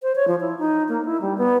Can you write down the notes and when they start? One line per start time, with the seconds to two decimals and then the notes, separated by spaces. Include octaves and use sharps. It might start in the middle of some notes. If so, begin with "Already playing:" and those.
0.03 C5
0.16 C#5
0.28 F3
0.41 E4
0.59 D#4
0.89 A#3
1.05 E4
1.21 G3
1.38 B3